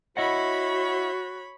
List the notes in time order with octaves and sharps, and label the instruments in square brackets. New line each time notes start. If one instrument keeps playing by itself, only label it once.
[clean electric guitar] E4 D#5 F#5 [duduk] F#4 [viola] C#5 B5